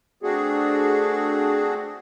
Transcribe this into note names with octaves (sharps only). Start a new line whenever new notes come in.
A3 C4 D4 F#4 G#4